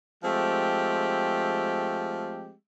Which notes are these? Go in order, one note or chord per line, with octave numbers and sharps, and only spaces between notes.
F3 G#3 A3 C4 G4